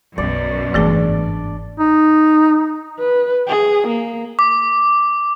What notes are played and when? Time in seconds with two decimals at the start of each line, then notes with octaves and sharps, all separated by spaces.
0.18 B1 F#2 B2 D3 D5
0.74 G1 G#2 E3 A3 D4 G#4 D5
1.79 D#4
2.99 B4
3.48 G#4
3.87 A#3
4.39 D6